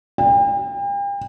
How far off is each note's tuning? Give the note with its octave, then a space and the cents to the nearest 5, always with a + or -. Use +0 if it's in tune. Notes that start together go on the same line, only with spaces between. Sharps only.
G5 +40